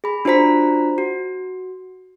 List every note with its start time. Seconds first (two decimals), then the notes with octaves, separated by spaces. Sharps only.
0.04 G#4 B5
0.25 D4 F4 F#4 C5 A#5 B6
0.98 F#4